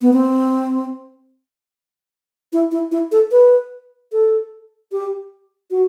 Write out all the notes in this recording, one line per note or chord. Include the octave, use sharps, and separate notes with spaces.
B3
C4
E4
E4
E4
A4
B4
A4
G4
F#4